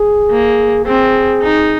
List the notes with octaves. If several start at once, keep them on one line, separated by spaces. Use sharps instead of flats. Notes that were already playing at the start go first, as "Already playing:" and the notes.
Already playing: G#4
A#3
C4 G#4
D#4